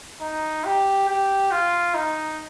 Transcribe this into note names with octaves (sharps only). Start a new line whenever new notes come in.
D#4
G4
G4
F4
D#4